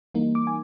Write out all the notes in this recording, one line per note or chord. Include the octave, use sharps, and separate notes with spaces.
E3 G3 A#3 D#4
D6
G#5